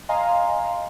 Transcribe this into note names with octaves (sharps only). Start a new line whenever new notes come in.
D#5 F5 G#5 A#5 C6